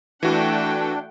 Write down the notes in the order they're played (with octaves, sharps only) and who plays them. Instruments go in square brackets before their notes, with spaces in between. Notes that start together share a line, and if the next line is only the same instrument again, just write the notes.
[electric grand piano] E3 F#4 [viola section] A3 F#5 G5 [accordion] D4